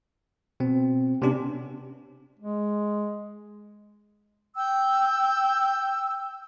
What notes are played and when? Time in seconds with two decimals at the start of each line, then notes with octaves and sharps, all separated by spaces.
0.60 B2 C4
1.22 C3 B3 C#4 D4 G4
2.39 G#3
4.55 G5 E6